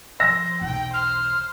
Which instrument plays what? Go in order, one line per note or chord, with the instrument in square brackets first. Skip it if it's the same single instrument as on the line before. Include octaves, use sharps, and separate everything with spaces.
[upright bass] F3 [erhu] C5 [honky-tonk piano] E6 A#6
[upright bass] B1 E2 [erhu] G5
[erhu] C5 [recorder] F6